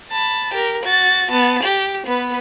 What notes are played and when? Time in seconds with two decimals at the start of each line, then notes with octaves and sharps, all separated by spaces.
0.11 A5 B5
0.54 G4 A#4
0.84 F#4 A6
1.31 B3 A5
1.64 G4
2.07 B3 B4